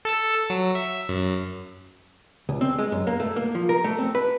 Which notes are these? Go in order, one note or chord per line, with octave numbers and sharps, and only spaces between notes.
A4 A5 E6
F#3
E5
F#2
C#2
C4
G#3
F#2
A#3
A3
A#3
F3
A#4
A3
C4
B4